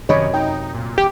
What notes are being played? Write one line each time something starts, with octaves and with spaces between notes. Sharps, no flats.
F#2 C3 D#3 C#5 D#5 B5
D#4 G5
A#2
D#1 G4